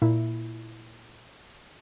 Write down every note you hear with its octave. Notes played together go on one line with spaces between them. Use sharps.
A#2 E4